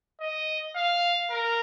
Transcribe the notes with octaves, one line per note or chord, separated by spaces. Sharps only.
D#5
F5
A#4